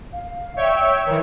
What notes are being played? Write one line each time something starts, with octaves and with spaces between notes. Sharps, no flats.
F5
C#5 D5 E5 G5
E6
D#3 E3 C#5